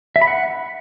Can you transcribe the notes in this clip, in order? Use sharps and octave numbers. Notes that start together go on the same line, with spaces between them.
E5
B5
F#5